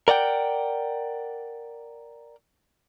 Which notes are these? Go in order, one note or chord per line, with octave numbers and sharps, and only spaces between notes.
A#4 D5 F#5 G5